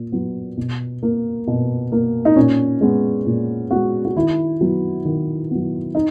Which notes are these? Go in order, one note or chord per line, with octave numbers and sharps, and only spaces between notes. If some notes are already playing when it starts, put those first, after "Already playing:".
Already playing: A#2
F#3 B3
B2
A#3
B2
A#3
D#4
A#2 C#4
G#3 B3
A#2
G#3 B3 F#4
F#4
D#3 E4
F#3 B3
D#3
F#3 B3
D#4